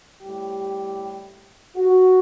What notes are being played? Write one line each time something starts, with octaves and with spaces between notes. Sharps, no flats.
A2 G3 G4
F#4